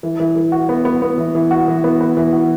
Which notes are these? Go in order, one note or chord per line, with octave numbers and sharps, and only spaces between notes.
E3
E3
E3
F#4
B3
B3
B3
E3
E3
F#4
E3
B3
B3
E3
F#4